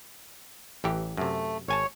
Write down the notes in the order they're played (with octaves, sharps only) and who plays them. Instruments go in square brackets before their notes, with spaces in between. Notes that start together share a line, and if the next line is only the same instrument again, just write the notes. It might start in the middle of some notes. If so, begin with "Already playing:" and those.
[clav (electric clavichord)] A1 E3 G4
[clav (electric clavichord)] F#2 C3 [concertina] A3
[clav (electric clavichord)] G#1 G#5 A5 [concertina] C#5